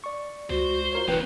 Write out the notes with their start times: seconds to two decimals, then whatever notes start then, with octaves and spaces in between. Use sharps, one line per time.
0.04 D5 C#6
0.50 C#2 F#4 C5
0.93 F4 A#4 C#5
1.08 E1 E3 A#3 C#4 B4 G5